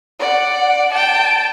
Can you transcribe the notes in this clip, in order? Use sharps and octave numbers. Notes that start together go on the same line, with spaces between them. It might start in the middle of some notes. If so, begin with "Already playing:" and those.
D5 F#5
G5 A5